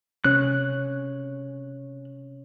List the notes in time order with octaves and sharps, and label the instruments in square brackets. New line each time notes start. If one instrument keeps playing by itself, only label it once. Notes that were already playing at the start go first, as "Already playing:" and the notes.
[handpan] C3 C#4 C#5 [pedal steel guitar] F#6